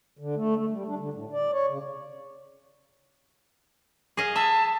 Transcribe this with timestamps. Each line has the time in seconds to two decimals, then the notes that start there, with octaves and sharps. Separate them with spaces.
0.19 D3
0.36 A3
0.56 A3
0.70 G3
0.87 D4
0.99 D3
1.14 A2
1.33 D5
1.52 C#5
1.67 C#3
4.17 G#4 D#5 F5
4.36 E5 A5